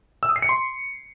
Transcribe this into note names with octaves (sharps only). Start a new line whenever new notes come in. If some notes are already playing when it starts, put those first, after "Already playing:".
E6
D#6
C7
C#7
C6